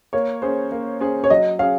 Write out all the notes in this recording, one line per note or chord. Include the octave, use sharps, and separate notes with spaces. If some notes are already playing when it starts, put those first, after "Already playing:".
A#3 C#5
C#4 G#4 C5
A#3
C#4 G#4 C5
C#5
F#3 D#5
C#4 G#4 F5